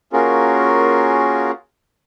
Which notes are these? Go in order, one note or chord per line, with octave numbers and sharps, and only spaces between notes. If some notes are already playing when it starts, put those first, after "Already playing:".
A#3 C#4 F4 F#4 G#4 A#4